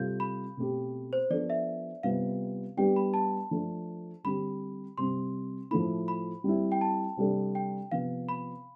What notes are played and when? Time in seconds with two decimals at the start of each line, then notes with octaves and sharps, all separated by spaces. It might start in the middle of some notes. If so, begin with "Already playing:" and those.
Already playing: C3 G3 C4 F4 A4 G6
0.20 B5
0.57 B2 A3 C4 G4
1.13 C5
1.30 F3 B3 D4 A4 D5
1.50 E5
2.03 C3 G3 B3 F4 F5
2.77 G3 B3 D4 G4 G5
2.96 B5
3.14 A5
3.51 F3 A3 D4
4.24 D3 G3 C4 G4 B5
4.98 C3 G3 C4 C6
5.71 A2 F3 A3 E4 B5
6.08 B5
6.44 G3 C4 E4
6.72 G5
6.81 A5
7.17 C3 G3 D4 A4
7.55 G5
7.91 C3 F3 B3 F5
8.29 B5